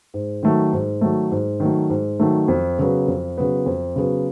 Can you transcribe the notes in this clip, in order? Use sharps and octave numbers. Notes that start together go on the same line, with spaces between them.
G#2
D#3 F#3 A3
G#2
D#3 F#3 A3
G#2
D#3 F#3 A3
G#2
D#3 F#3 A3
F2
C#3 F#3 B3
F2
C#3 F#3 B3
F2
C#3 F#3 B3